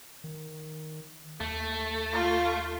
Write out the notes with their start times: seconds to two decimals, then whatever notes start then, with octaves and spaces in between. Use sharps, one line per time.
0.24 D#3
1.40 D#2 A3
2.13 F4